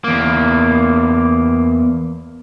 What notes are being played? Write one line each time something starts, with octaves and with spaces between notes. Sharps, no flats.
E2 A#3